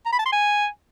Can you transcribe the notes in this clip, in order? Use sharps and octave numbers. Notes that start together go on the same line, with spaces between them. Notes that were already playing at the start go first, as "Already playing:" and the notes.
A#5
B5
A5
C6
G#5